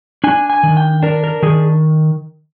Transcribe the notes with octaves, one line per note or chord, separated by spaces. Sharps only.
D4 G#5
G#5
D#3
G5
D4 A#4
A#4
D#3 G#4